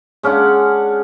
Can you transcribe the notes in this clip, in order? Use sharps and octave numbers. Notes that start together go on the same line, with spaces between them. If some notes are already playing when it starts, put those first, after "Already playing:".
G#3 C#4 D4 F#5